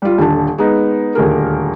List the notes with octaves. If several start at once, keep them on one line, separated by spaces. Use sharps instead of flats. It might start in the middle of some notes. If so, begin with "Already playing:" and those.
G3 F4
D#1 D3 A5
G#3 B3 D#4
D#1 D2 G#4 A#4